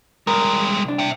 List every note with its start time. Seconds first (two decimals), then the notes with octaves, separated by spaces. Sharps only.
0.27 G3 G#3 A#4
0.84 C2 D4
0.99 E5 G5